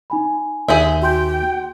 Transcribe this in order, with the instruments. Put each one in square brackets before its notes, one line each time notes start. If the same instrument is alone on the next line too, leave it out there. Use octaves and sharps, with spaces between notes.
[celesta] D#4 G#5 B5
[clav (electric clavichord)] D#2 [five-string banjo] G#4 C5 E5
[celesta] F#4 C6 G6 [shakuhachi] G5